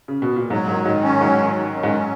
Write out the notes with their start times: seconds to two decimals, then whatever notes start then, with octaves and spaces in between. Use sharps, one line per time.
0.08 C#3
0.22 B2
0.36 A#2
0.50 G#2 F#3
0.68 G#2 D#3
0.85 G#2 D#3
1.03 C#4
1.21 G#2 F#3
1.38 D#3
1.56 D#3
1.74 C#4
1.83 G#2
1.92 F#3